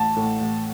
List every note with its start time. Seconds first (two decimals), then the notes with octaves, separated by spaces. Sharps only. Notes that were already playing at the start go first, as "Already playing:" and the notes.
Already playing: A1 A5
0.16 A2
0.41 A1